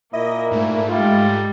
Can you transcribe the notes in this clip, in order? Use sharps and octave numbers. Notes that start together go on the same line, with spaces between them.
A#2 A#3 E4 D#5
G#2 A3
G3 G#3 F4